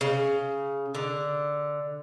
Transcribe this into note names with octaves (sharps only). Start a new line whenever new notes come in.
C#3
D3